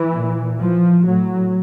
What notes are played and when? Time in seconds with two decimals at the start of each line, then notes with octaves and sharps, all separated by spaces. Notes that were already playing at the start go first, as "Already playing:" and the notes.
Already playing: E3
0.13 A#2
0.59 F3
1.06 A2 F#3